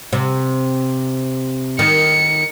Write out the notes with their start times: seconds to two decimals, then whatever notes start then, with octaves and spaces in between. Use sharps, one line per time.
0.13 C3
1.79 D#3 C#7